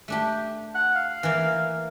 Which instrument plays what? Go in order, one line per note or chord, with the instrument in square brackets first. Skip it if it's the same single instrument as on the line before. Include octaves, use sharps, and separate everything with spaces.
[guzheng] A3 D4 G4
[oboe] F#5
F5
[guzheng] E3 A#3